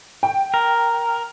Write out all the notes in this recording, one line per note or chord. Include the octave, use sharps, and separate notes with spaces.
G5
A#4